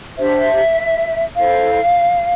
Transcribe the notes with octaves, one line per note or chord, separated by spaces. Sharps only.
D4 G4 C5 E5
E4 A4 C5 F5